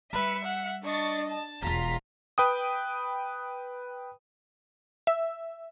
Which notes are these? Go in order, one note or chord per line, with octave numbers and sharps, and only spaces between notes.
G3 B4 E5 C#7
F#5
D4 D#5 C#6 A6
A5
E1 E2 F4 A#5 B6
B4 G5 D#6
E5